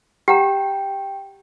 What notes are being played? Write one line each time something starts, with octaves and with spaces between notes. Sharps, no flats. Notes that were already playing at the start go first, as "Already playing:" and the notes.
G4 F#5 G5 A#5